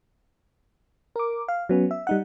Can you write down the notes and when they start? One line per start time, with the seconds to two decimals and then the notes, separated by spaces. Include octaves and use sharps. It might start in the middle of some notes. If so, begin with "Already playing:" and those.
1.16 A#4 D6
1.48 F5
1.69 F#3 B3 C#4
1.91 E5
2.07 G3 D#4 F#5